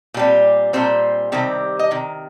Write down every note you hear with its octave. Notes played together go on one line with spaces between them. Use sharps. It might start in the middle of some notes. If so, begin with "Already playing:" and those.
A#2 G3 C4
A#2 G3 C4 C5
C3 D#3 G3 C4
D#5
C3 D#3